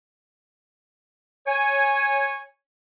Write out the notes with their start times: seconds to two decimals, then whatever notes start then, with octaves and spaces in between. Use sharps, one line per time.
1.46 C#5 G#5